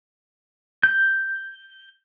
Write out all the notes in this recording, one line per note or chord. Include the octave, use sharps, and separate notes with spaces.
G6